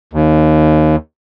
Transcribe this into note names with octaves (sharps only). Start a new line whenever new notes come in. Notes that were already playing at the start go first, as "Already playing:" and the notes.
D#2